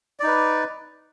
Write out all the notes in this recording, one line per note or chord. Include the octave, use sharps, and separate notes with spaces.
D#4 B4 D5